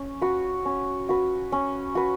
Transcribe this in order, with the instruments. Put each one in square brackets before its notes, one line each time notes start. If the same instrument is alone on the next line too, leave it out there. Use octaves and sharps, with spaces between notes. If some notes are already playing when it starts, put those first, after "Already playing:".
Already playing: [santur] C#4
F#4 B4
C#4
F#4 B4
C#4
F#4 B4